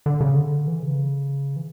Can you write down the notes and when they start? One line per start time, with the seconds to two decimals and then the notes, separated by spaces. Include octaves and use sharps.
0.06 D3
0.21 C#3
0.36 D3
0.67 E3
0.83 C#3
1.56 E3